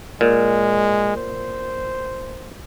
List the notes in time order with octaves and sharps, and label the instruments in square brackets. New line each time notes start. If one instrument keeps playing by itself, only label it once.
[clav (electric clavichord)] A#2 [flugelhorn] G#3
[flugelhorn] C5